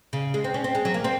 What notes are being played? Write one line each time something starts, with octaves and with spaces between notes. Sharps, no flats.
C#3
G#3
C4
C#4
C4
G#3
F#3
A#3
C4